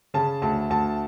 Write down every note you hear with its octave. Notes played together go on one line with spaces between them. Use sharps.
C#3 A5
D2 A5
D2 A5